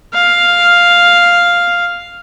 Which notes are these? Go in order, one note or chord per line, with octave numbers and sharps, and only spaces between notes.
F5